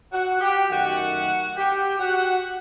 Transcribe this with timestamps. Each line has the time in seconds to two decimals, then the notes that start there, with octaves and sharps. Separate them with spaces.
0.12 F#4 F#5
0.41 G4 G5
0.70 F#2 D#3 A3 F#4 F#5
1.56 G4 G5
1.99 F#4 F#5